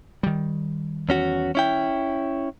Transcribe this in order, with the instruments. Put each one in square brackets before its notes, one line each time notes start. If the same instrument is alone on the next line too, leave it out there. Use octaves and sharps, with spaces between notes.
[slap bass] D#3 G3
[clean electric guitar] E2 C#4 F#4
C#4 E4 G5